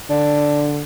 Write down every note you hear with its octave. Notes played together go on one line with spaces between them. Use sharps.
D3 D4